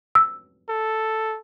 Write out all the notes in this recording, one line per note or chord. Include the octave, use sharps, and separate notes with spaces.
E6
A4